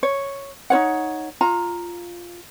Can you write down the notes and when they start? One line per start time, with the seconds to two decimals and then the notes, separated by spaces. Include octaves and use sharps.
0.03 C#5
0.70 D#4 F4 C#5 F#5
1.41 F4 A#5